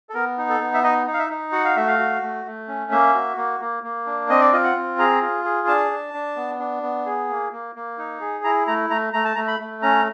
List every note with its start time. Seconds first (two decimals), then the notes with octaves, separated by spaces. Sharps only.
0.09 A4
0.14 B3 A#4
0.38 D#4
0.49 A4
0.60 B3
0.74 E5
0.84 D#4 D#5
1.06 D#4
1.13 F5
1.19 E5
1.30 D#4
1.52 F#4 F#5
1.65 F5
1.76 A3 E5
1.87 F5
1.99 F#4
2.22 A3
2.46 A3
2.68 C#4
2.91 A#3 E5
3.14 F#4
3.37 A#3
3.60 A#3
3.83 A#3
4.06 D4
4.29 C4 D#5
4.41 D5
4.52 F4 D#5
4.64 F#5
4.76 C4
4.99 G#4 A#5
5.21 F4
5.44 G#4
5.67 D4 A5
5.91 D4
6.14 D4
6.36 B3
6.59 D4
6.83 B3
7.06 G#4
7.29 A#3
7.52 A#3
7.75 A#3
7.98 D#4
8.21 G#4
8.44 E4 A#5
8.67 A3 A#5
8.90 A3 A#5
9.13 A3 A#5
9.25 A5
9.35 A3 A#5
9.48 B5
9.60 A3
9.82 C#4 A#5